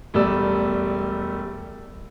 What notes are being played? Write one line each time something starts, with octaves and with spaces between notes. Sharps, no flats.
E1 G3 A3 D5 E6